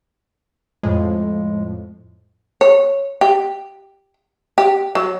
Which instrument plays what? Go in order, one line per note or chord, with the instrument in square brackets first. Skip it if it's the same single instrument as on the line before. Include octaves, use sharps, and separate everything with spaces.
[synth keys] F2 A2 F3 [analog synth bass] G#3
[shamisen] C#5
G4
G4
F#3